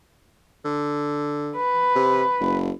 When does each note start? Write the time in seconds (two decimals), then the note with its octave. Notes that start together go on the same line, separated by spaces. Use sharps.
0.65 D3
1.57 B4
1.95 C3
2.40 F#1